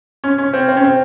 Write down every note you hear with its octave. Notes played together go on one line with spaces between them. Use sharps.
C#4
C#4
C4
C4
C#4
C4